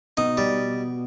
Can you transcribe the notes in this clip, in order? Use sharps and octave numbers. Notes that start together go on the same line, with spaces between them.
B2 D#4
G3